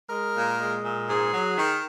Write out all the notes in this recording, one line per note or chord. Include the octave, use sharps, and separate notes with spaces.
G#3 A#4
A#2
G#3
A#2
G#2 G#4
F#3
D#3